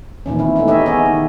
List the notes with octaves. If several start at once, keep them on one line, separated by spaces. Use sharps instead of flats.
A#2 D#3 E3 C#4
C4 E4
A3 B3 C#4 D#4 E4
D#4 G4 C#5 D#5 E5
B3 C#4 G#4 C#5 D#5
D#3